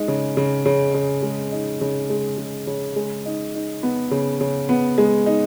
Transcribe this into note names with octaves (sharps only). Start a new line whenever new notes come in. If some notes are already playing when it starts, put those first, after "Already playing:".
Already playing: G#3 D#4
C#3
C#3
C#3
C#3
G#3
D#4
C#3
G#3
C#3
C#3
G#3
D#4
D#4
B3
C#3
C#3
B3
G#3
D#4